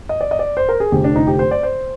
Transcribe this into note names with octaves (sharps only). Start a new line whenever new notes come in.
D#5
D5
D#5
D5
C5
A#4
G#4
F1 F2 D3 G4
D4
D#4
G4
C5
D5
C5